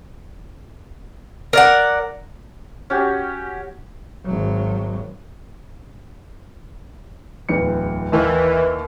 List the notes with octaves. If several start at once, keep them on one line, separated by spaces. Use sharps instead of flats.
A#4 D5 F#5
C#4 F#4 G4
G#1 F#3
D1 E2 C#7
D#2 D#3 E3